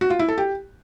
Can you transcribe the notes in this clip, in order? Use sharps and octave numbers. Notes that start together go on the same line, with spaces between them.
F#4
F4
E4
A4
G4